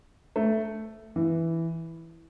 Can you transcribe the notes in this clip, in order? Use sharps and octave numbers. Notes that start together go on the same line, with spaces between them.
A3
E3